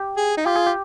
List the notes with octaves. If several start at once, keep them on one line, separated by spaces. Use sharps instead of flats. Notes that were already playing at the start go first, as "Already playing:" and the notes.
Already playing: G4
G#4
D#4
F4 G4
G#4
G4